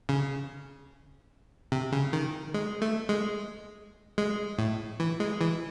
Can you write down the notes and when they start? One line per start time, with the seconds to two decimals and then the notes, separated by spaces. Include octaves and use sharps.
0.09 C#3
1.72 C3
1.92 C#3
2.13 D#3
2.54 G#3
2.82 A3
3.09 G#3
4.18 G#3
4.59 A2
5.00 E3
5.20 G#3
5.41 E3